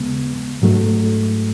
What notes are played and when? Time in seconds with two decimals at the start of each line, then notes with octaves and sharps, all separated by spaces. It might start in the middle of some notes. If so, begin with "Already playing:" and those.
Already playing: D#2 C#3 G#3 B3
0.62 G#2 F#3 A3